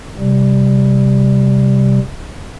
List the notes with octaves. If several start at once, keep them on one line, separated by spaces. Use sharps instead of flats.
C3 G3